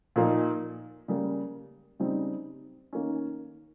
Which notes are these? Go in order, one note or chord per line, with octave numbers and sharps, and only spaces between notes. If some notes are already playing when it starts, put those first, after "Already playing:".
A#2 F3 A#3 D#4
C#3 G3 A#3
C#3 G3 C4 D#4
D#3 A#3 C#4